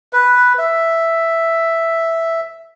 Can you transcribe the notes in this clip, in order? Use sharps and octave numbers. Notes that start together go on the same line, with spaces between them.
B4
E5